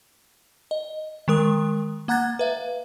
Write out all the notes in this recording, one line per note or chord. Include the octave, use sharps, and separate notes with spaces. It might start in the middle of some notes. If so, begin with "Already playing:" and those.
D#5
D#3 G#3 A#4 D#6
A#3 F#5 A#5 F#6 G#6 A6
B4 E5 F5